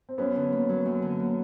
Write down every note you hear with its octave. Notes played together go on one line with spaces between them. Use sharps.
C4
F#2 B3 C#4
D3
A#3
F#3
F#2
D3
A#3